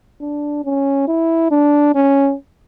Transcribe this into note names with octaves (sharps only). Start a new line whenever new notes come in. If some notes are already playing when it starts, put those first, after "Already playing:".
D4
C#4
E4
D4
C#4